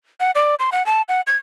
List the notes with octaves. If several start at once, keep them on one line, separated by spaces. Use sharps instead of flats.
F#5
D5
C6
F#5
A5
F#5
G#6